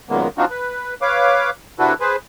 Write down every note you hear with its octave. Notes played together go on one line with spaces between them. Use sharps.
F#2 A#2 D#3 G#3 A#3 B3
F3 C4 D4 D#4 F4 F#4
B4
B4 C#5 F5 D6
C3 D4 E4 F#4 A4 B4
G#4 B4 C5